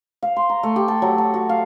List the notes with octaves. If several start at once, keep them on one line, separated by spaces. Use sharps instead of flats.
F5
C6
A#5
A3
G4
A5
F#3
A5
F#4
F5